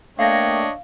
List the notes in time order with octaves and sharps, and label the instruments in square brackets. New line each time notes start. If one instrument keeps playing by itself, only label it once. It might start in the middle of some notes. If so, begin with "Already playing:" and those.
[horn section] A3 A#3 G5 [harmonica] D4 C#5 D#5 [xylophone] F5 A#6